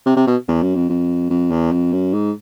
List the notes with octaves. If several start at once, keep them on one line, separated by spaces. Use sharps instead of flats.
C3
C3
B2
E2
F#2
F2
F2
F2
E2
F2
F#2
G#2